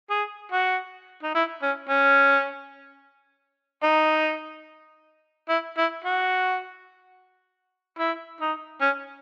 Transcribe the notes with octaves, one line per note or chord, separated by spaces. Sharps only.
G#4
F#4
D#4
E4
C#4
C#4
D#4
E4
E4
F#4
E4
D#4
C#4